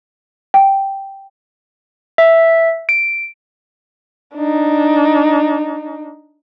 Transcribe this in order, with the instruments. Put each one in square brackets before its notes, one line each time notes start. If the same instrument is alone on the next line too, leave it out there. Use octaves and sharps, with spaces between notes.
[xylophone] G5
[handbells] E5
D7
[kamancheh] D4 D#4